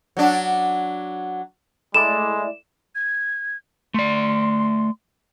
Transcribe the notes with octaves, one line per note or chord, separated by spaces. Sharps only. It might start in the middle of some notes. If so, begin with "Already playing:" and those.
F#3 D4
G#3 A3 E4 D5 E7
G#6
A3 D5 C6